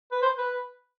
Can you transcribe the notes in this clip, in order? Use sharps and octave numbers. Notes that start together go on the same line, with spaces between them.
B4
C5
B4